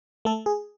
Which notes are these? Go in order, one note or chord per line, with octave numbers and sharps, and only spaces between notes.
A3 A4
G#4